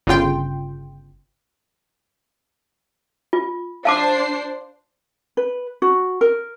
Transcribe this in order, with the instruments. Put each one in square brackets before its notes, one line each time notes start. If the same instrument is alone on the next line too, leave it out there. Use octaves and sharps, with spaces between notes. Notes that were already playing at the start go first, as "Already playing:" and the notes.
[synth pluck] G1 C#3 F4 G5 C6
[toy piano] F4
[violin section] D4 C5 C7 [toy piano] F5 A5 D6
[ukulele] B4
F#4
A#4